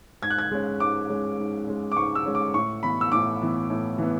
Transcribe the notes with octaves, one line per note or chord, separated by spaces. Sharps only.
G#2 G#6
F#6
G#6
G#3 C#4
G#2 D6
G#3 C#4
G#2
G#3 C#4
D6
G#2 C#6
E6
G#3 C#4
D6
A2 C#6
E3 B3 B5
E6
A2 D6
E3 B3
A2
E3 B3